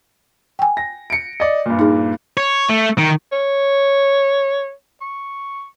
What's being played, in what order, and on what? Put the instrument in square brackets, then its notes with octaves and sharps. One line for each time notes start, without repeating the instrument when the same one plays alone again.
[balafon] G5 G#5
[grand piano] A#6
C#7 D7
D5 D#5
G2 A#2
[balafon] D#4 G#4
[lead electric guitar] C#5
A3
D#3
[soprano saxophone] C#5
C#6